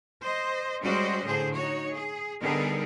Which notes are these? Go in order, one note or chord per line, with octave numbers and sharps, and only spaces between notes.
C5 D#5
G3 G#3 C#4 F#4 C5 D#5
A2 D3 G#4 C5
D#4 F#4 C#5
G#4
D3 G3 B3 D#4 G#4 A#4